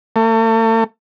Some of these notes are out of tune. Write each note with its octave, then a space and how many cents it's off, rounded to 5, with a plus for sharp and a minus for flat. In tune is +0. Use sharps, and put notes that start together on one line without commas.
A3 +40